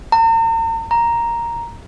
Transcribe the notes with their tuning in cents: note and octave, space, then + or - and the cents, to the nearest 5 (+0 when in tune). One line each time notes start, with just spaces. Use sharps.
A#5 -40
A#5 +0